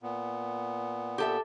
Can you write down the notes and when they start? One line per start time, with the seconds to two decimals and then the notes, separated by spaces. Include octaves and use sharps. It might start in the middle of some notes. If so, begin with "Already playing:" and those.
0.03 A#2 B3
1.18 G4 A4 E5